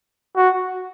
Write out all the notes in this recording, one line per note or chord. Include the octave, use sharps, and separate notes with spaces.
F#4